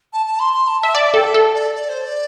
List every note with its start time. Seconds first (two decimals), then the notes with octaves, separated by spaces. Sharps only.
0.13 A5
0.26 A5
0.40 C6
0.54 C6
0.68 A5
0.81 E5 A5
0.95 D5 E5
1.05 E5
1.14 A4 G5
1.24 E5
1.34 A4
1.55 D5
1.75 D5
1.89 C5
2.02 D5